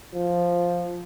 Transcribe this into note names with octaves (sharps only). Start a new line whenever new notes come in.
F3